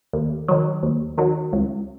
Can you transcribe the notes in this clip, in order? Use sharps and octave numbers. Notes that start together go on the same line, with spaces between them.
D#2
D#3 F#3
D#2
D#3 F#3
C#2